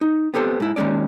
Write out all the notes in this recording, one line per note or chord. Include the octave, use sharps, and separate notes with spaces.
D#4
B3 C4 G4 A4 C5
G#2 E4
D#2 A#2 G#3 C#4 D5